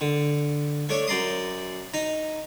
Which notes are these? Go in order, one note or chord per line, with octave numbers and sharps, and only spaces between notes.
D3
A3 D4 C#5
F#2 D5 A#5 C6 D#6
D#4 A#5